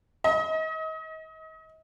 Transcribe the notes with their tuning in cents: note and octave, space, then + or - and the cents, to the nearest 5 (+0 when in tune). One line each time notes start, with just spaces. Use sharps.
D#5 +35